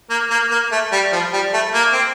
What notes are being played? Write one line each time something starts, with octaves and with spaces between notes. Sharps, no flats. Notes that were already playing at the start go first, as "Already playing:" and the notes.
A#3
A#3
A#3
A3
G3
F3
G3
A3
A#3
C4